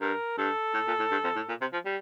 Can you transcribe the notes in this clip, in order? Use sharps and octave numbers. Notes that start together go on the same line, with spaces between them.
G2 A#4
G2 A4
A2
A#2
A2
G2
F2
A2
A#2
C3
F3
G3